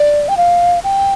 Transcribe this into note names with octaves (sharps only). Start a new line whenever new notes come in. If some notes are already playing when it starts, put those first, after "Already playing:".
Already playing: D5
G5
F5
G5